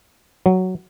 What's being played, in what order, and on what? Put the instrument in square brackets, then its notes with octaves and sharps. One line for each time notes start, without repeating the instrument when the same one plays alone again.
[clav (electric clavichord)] F#3